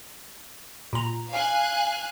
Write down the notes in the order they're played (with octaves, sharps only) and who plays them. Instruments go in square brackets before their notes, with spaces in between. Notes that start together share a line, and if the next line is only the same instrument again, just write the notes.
[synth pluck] A#2 A#5
[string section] F5 G#5 F#6